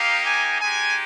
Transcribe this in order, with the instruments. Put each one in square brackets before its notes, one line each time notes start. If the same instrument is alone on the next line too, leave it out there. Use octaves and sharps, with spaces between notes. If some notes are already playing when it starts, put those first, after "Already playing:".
Already playing: [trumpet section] A#3 D#4 G4 F5
G#5
G#3 D#4 G4 G#5